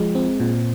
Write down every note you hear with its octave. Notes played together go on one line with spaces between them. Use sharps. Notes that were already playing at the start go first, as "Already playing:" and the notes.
Already playing: F3 G#3
C4
A#2